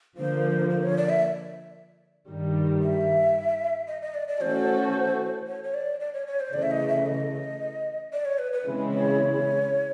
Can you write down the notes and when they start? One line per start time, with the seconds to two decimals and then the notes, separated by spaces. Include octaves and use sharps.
0.17 D3 F3 A#3 C5
0.69 C5
0.83 C#5
0.97 D5
1.09 E5
2.29 G2 D#3 G3
2.83 E5
3.88 D#5
4.02 D#5
4.14 D5
4.28 D5
4.41 E3 A3 C#4 F#4 A4 C5
5.47 C#5
5.64 C#5
5.74 D5
6.00 D5
6.13 C#5
6.27 C#5
6.40 C5
6.53 C#3 E3 A3 D5
6.62 E5
6.71 D#5
6.88 E5
7.06 D#5
8.13 D5
8.25 C#5
8.38 B4
8.52 B4
8.65 C#3 E3 G#3 C4 E4
8.92 C#5